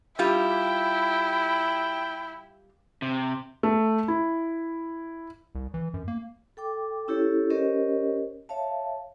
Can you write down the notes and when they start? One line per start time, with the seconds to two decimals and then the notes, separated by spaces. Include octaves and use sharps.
0.19 G3 E4 F4 G4 G5
3.02 C3
3.63 A3
4.08 E4
5.55 C2
5.74 E3
5.94 F#2
6.08 A#3
6.57 A4 G5 D6
7.08 C#4 E4 G4 A4 C#5
7.50 C#4 G4 A#4 C5 C#5 D#5
8.49 C#5 E5 F5 A5